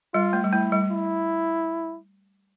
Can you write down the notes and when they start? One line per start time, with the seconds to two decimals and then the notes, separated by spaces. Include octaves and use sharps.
0.14 G3 F4
0.33 A3
0.44 G3
0.53 A3 E4
0.72 G3
0.91 E4